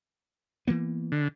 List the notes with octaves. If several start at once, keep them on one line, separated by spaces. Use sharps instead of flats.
E3 A#3 B3
D3